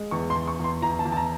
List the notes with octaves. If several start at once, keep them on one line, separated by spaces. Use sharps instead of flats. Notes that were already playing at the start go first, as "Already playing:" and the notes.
Already playing: G#3
E2 C#6
C6
E2
C#6
E2 C6
E2 A#5
A5
E2
A5
A#5